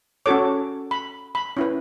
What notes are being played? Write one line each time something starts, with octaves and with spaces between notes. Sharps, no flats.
C#4 F#4 A4 C#5 D6
B5
B5
C#4 E4 B4